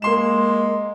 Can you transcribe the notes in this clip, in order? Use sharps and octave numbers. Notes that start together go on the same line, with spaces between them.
G#3 A#3 C6 E7